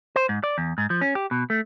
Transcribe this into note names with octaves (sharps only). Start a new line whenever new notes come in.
C5
G#2
D5
E2
G#2
F3
C#4
G4
B2
A3